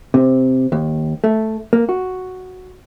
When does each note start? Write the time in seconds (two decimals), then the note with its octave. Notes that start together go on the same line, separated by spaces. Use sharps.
0.14 C3
0.72 D#2
1.24 A3
1.73 A#3
1.89 F#4